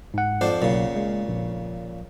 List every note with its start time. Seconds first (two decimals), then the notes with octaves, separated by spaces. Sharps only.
0.14 G#2 F#5
0.41 F2 D4 C5
0.62 B1 A#2 C#3
0.96 G#3
1.28 A#1